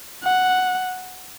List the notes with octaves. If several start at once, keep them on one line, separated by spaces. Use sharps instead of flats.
F#5